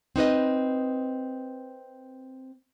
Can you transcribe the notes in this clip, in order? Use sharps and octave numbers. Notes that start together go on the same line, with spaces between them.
C4 D#4 B4 D#5